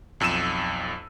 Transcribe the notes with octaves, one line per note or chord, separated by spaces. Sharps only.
B1 F2 E6 D#7 E7